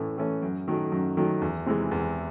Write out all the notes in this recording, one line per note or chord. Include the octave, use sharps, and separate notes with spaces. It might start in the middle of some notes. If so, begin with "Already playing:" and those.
Already playing: A2 E3 A3 C#4
E3 A3 C#4
F#2
D#3 F#3 A3
F#2
D#3 F#3 A3
E2
C3 E3 G#3
E2